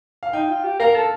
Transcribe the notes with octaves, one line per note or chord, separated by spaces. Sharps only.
F5
D#4 G5
F4
G4
A#4 F5
A4